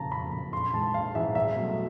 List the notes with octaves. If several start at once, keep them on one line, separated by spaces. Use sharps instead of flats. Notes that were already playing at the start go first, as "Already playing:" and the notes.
Already playing: F#1 F2 C#3 A5 A#5
F#1 B5
F2 C#3
A#1 C6
G#2 E3 G#3 A5
A#1 F5
G#2 E3 G#3 E5
C2 E5
B2 F#3 A3